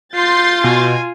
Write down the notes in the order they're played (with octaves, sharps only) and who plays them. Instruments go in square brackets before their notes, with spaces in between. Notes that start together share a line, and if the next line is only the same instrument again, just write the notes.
[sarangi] F4 [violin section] C6 G6 A6 [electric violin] C7
[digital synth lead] B2 [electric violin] G#5